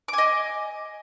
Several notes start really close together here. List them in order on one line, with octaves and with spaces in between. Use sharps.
D6 G#5 D#5